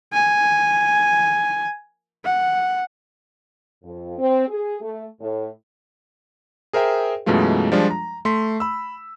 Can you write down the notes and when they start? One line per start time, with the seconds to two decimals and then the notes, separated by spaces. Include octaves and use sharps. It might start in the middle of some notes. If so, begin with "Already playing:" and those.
0.13 G#5
2.24 F#5
3.84 F2
4.18 C4
4.48 G#4
4.81 A3
5.20 A2
6.73 G#4 A#4 C5 E5 G5
7.26 F#2 B2 E3 G#3 A3 F4
7.72 F3 G3 G#3 D4 F4
7.91 A#5
8.25 A3 C6 B6
8.60 B5 E6